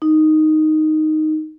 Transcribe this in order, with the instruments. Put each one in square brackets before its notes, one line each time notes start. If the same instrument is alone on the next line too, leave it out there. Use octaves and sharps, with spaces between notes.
[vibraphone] D#4